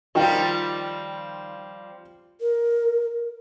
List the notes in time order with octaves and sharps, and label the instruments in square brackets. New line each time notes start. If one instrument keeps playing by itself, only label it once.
[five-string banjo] D#3 D#5 [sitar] F3 G3 C4 [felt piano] F4 G5
[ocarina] A#4